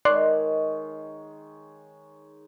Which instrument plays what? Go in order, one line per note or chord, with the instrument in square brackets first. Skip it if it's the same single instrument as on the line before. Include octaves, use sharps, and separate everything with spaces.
[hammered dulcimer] D#3 G#3 C#5 [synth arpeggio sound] D5 C6 F#6